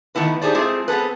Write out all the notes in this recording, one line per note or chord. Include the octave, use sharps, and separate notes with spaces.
D#3 A3 B3 E4 B4
D4 D#4 G4 G#4 C5 D5
G#3 A3 C4 E4 F4 G#4
B3 C4 G#4 A4 B4